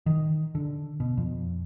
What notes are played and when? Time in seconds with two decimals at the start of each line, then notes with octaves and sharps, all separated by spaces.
0.06 D#3
0.55 D3
1.00 B2
1.17 F2